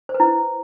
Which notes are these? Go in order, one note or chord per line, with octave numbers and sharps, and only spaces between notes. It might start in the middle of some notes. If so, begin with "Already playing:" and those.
C5
B4
E4